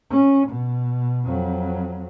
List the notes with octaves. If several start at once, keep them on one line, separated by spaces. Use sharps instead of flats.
C#4
B2
F2 F#3